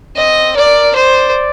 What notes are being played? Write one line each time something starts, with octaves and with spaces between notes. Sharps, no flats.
C4 D#5
A#4 D5
C5 D5